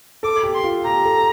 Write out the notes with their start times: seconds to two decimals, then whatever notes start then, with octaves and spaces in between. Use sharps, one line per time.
0.23 A4 D6
0.43 G4
0.54 C6
0.64 F4
0.85 G4 A#5
1.05 A4